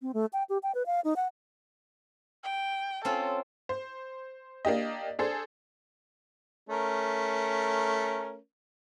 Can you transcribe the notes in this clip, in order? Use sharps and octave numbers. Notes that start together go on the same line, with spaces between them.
C4
A3
G5
G4
G5
B4
F5
D#4
F#5
G5
C4 C#4 F4 A4
C5
A#3 D4 G4 D#5
D4 G#4 A4 C5
A3 C#4 A#4